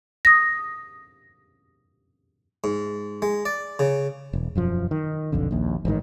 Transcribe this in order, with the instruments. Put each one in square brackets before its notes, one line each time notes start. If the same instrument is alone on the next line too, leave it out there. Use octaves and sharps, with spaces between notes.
[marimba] D#6 A#6
[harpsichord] G#2
G#3
D5
C#3
[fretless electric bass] E1
E1 F#2 F3
D#3
F1 B1 F2 D3
A#1 D#2
A1 G#2 B2 D#3